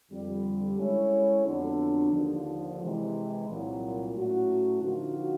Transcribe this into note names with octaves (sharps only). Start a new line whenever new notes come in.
F2 D3 G3
G#3 C#4 E4 A4 C#5
F2 D3 F#3 B3 D4
D#2 D3 F3
C3 E3 G#3
C2 A#2 F#3
A2 F#3 A3 C#4 F#4
D3 F3 A#3 D#4 F#4